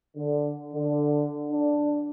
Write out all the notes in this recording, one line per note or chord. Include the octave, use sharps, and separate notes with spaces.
D3
D3
D4